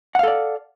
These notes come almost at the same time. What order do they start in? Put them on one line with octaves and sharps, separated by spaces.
F#5 F5 A4 D5